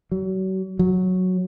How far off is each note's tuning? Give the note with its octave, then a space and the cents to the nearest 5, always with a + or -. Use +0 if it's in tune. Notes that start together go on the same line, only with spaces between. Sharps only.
F#3 +35
F#3 -5